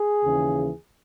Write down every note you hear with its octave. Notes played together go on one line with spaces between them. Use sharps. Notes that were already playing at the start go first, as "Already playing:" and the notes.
Already playing: G#4
D#2 C#3 E3